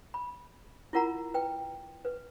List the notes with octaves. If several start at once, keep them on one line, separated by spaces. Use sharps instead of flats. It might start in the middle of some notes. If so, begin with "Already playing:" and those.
B5
E4 F4 A#4 F#5 A#5
B4 G5
B4